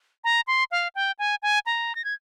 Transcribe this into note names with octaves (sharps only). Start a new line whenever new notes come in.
A#5
C6
F5
G5
G#5
G#5
A#5
A#6
G#6